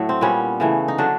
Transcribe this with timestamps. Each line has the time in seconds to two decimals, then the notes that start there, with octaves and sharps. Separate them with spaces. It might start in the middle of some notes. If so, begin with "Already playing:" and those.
Already playing: A2 F#3 A3
0.09 C4
0.21 A#2 G3 B3 C#4
0.60 C#3 E3 A3
0.88 D#4
0.98 D3 F#3 D4